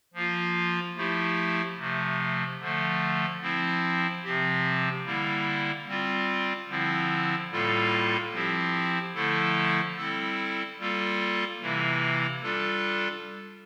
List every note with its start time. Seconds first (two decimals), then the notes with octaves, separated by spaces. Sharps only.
0.14 F3 A#3 F4
0.96 F3 A3 E4 G4
1.77 C3 F3 A3
2.60 D3 F3 A3
3.41 F3 C4 E4
4.24 C3 F3 C4 G4
5.05 D3 G3 A#3 E4
5.88 G3 C4 F4
6.69 D3 F3 C4 E4
7.51 A2 G3 A#3 F4 A4
8.33 F3 C4 E4 G4
9.15 D3 F3 A3 E4 A4
9.97 G3 C4 E4 A4
10.79 G3 A#3 F4 A4
11.61 C3 E3 A#3 E4
12.42 G3 D4 F4 A4